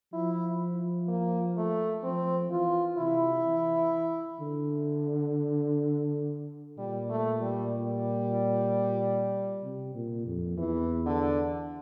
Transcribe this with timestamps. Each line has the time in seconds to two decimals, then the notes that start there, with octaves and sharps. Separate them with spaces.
0.13 F3 E4
1.08 A#3
1.57 A3
2.03 F3 C4
2.50 E3 F4
2.98 C3 E4
3.46 E3
4.40 D3
6.78 A#2 G3
7.10 A3
7.41 G3
7.73 G3
9.63 C3
9.94 A#2
10.26 F2
10.57 E2 E3
11.06 D3